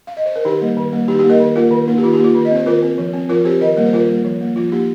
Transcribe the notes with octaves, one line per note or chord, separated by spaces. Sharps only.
F5
D#5
C5
A#4
D#3 D#4 G4
G3 A#3
D#3
G3 A#3
D#3 D#4 G4
D#4 G4
A#3
A#4 D#5
D#3
A#3 F4 A#4
D#3
A#3 D#4
G4
D#3 F4
D#4 G4
A#3 F4
D#3
D#5
C4 C5
D#3 F4 A#4
C4
F3
C4
F3 F4 A#4
C4 G4 C5
D#3 A#4 D#5
G3 A#3 A#4
C5
D#3 F4 A#4
G3 A#3
F3
A#3
F3 F4
A#3 D#4 G4